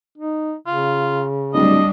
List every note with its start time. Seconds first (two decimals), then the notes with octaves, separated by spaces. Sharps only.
0.18 D#4
0.67 C#3 F4
1.54 D1 G3 D4 D#5